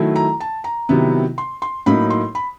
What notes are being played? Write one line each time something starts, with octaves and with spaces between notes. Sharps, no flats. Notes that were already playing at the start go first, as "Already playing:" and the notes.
Already playing: D#3 F#3 A3 E4
A#5
A5
A#5
C3 D#3 F#3 B3 E4
C6
C6
A2 F#3 A#3 D#4 B5
C6
B5